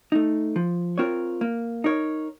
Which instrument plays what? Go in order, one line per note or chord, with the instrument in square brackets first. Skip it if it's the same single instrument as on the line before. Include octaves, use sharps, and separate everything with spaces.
[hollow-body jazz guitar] A3 D#4
F3
C4 F4 A#4 C#5
A#3
D#4 A#4 C#5